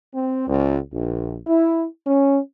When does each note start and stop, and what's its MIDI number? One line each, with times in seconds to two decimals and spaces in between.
0.14 0.46 60
0.48 0.77 37
0.92 1.37 34
1.47 1.86 64
2.07 2.39 61